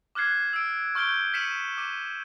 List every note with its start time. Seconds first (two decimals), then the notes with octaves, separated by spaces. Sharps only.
0.15 D6 F6 F#6 G#6 C7
0.53 E6 C7 D7
0.95 C#6 F6 G6 D7 G7
1.33 F6 B6 C#7 D#7 E7 F#7
1.78 D6 D#7